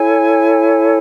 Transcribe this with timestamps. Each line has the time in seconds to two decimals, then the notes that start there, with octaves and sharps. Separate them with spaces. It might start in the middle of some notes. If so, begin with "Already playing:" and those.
Already playing: E4 A4 C#5 G#5